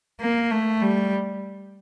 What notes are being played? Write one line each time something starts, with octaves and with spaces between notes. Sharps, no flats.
A#3
A3
G3